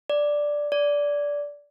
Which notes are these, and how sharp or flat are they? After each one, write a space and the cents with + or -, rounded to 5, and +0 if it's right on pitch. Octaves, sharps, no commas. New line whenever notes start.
D5 +0
D5 -15